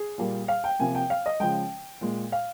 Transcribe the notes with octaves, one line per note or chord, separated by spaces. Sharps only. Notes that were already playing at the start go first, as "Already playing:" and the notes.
Already playing: G#4
A#2 G3 A#3
F5
G5
C3 F3 A#3 G#5
G5
F5
D#5
C#3 F3 G#3 G5
A#2 G#3
F5